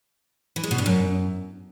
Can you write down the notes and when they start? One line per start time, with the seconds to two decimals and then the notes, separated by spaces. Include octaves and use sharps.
0.56 E3
0.63 G#3
0.71 B2
0.78 G2
0.86 F#2